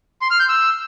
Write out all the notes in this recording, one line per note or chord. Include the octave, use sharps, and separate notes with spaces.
C6
F6
G6
E6